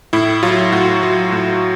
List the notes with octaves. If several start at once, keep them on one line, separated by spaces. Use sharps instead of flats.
A2 E4
F#3 F4
A2 F#4
F#3
A2